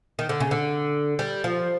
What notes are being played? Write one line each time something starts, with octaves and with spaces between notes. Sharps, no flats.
D#3
D3
C#3
D3
G3
F3